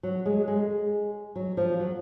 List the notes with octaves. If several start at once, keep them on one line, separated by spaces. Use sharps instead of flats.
F#3
G#3
G#3
F#3
F3
F#3